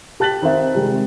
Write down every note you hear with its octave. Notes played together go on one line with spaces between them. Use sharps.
G4 A5 F#6 A6 B6 F#7
D#3 C4 C5 E5
C3 D#3 G3 G#3